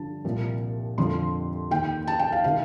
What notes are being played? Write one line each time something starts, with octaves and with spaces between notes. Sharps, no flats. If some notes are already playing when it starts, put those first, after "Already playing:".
Already playing: G2 D3 F3 A5
C2 A#2 F3
F2 D3 F3 C6
D#2 D#3 G5
A5
G5
F5
C3 D#3 F5